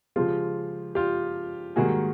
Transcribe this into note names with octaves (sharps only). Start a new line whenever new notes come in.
C#3 F3 G#3 F4 G4
F4 G4
G#2 D#3 G3 A#3 F#4 G#4